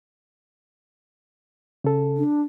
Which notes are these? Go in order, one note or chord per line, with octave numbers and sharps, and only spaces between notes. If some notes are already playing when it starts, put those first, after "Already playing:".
C#3 A4
D4